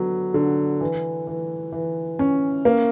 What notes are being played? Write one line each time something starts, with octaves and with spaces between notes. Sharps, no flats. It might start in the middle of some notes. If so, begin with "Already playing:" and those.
Already playing: D3 F#3 B3
D3
E3
E3
E3
C#4
A#3